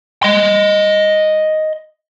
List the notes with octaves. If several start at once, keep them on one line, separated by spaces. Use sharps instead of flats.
D#5 C6